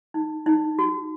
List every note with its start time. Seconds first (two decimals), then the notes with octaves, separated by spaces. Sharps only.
0.14 D#4
0.46 D#4
0.79 F#4